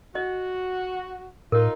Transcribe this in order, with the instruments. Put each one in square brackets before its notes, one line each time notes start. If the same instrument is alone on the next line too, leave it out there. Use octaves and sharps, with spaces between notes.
[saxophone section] F#4 [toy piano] D#5
[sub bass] A2 [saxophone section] D#4 F4 [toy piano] A#4